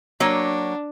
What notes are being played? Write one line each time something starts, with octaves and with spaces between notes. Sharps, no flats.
F#3 A#3 D4 C#5